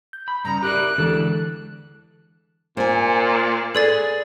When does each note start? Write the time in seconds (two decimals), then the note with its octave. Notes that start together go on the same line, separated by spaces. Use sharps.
0.13 G6
0.28 B5
0.45 G2 C#3 A#5
0.63 G4 A#4 D5 F#6
0.98 E2 D3 E3 G#3 A4
2.77 A#2 C5 G#5
3.75 G#4 A4 B4 D5 A6